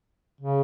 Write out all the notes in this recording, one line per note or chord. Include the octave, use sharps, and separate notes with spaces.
C#3